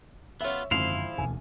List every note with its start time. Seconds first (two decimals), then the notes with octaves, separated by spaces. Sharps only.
0.41 B3 F4 C#5 E5
0.71 G#1 F#2 D3 F3 E4 F5 C6
1.18 E1 D2 B2 G#5